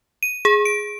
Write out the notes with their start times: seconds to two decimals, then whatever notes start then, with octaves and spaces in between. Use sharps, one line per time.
0.23 D#7
0.45 G#4
0.65 D7